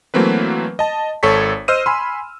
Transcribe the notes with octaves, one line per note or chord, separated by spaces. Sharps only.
E3 F#3 A3 A#3 C4 B4
D#5 A5
G#1 A4 C#5 C#6 B6
C5 D#5 E6 F6 D#7
G#5 B5 C6